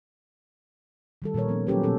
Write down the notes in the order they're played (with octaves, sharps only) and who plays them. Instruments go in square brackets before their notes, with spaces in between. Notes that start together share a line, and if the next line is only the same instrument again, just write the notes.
[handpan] D#3 G3 A4
A#2 D#3 G3 A#4 C#5
F3 G3 B3 C#4
F#3 A#3 C#4 G4 A4 B4
B2 F3 B3 C#4 A4